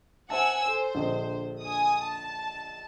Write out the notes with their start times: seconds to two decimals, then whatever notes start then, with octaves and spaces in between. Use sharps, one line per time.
0.30 C5 E5 F#5 G#5 A5 E6
0.66 A4 C5
0.95 A#1 D3 D#5
1.63 G#5 D#6
2.02 A5